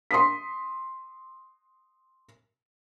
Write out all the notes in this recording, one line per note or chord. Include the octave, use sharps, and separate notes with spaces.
C6 D#6 B6